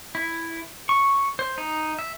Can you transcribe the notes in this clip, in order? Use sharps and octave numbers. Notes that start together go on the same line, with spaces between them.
E4
C#6
C5
D#4
E5